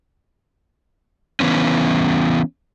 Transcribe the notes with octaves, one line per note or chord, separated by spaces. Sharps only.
E3 B3 C#4